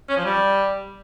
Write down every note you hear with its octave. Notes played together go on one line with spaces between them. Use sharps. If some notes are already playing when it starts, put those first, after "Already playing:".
C#4
F3
G3